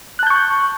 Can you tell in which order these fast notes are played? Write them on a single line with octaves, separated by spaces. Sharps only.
F#6 A5 G6 C#6